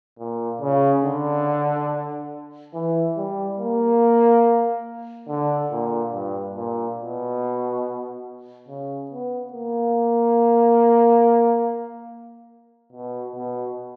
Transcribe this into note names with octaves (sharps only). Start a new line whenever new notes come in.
A#2
C#3
D3
E3
G3
A#3
D3
A#2
G2
A#2
B2
C#3
B3
A#3
B2
B2